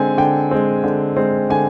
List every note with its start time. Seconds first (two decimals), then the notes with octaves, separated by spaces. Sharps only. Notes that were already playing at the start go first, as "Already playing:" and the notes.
Already playing: D3 G#3 C4 G#5
0.18 D3 G5
0.51 G#3 C4
0.84 D3
1.17 G#3 C4
1.50 D3 G#5